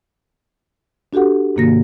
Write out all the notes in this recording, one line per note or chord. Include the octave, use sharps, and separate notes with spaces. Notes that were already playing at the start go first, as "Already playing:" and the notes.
D4 F#4 G4 A4 F#5
G#2 C3 D#3 A#3 F#4 A#6